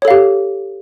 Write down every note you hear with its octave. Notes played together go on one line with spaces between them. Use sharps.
G4 A4 C#5 F5